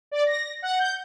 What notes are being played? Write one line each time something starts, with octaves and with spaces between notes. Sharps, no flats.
D5
A#6
F#5
G6